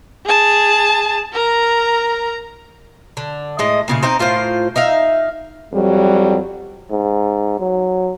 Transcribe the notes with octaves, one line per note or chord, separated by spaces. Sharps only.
G#4 A5
A#4 A#5
D3
A2 G#3 D#5
A#2 C#3 G#4
C4 D#4 A#4 D#5
A2 F4 A#4 C5
D#4 E5 F5
F2 F#3 G3
G#2
F#3